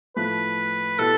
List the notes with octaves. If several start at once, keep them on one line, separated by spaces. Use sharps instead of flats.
A2 F3 A3 B4
B2 B3 E4 G4 A4